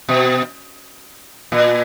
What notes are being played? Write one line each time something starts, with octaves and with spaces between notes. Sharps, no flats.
B2
A#2